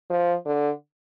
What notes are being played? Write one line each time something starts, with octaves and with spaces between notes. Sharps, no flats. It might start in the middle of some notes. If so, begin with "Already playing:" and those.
F3
D3